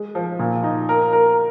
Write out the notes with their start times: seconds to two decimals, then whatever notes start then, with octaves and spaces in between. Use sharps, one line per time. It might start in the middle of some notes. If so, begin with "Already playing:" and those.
Already playing: G#3
0.15 F3
0.39 A#2
0.63 D#4
0.89 A#4
1.13 A#4